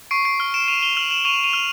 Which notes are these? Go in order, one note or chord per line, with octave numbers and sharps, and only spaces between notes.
C#6 C7 D7
C7 D7
F6
D7 E7
C#6 D#7 F7
F7 G7
F6 E7 F#7
E7 F#7
C#6 D#7 F7
D#7 F7
F6